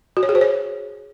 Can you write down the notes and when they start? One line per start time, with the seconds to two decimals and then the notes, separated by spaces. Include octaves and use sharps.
0.17 F#4
0.23 C#5
0.29 G#4
0.35 C5
0.41 C#5